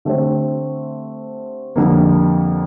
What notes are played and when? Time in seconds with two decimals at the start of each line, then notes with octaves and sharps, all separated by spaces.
0.05 D3 A3 C4 G4 C5
1.76 F2 D3 G3 A#3